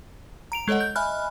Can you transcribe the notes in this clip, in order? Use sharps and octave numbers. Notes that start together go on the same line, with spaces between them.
A#5 D7 F7
G#3 A4 C#5 D#5 F#5
G6
D#5 E5 G#5 B5 F6 F#6